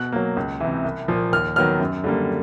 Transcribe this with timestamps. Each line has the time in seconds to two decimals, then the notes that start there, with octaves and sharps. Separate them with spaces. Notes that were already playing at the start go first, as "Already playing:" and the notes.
Already playing: B2 F#6
0.12 F#3 A#3
0.37 C#2
0.60 C3 E3
0.85 C2
1.08 A#2 F3 A#3
1.32 D#2 F6
1.56 D#3 F#3 B3 F6
1.80 F#2
2.04 D3 G3 A#3